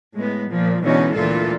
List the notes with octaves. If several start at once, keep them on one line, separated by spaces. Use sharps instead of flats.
A2 G#3 B3
A#2 F3
B2 D3 E3 G#3 C#4 D#4
D2 A#2 E3 F4 A4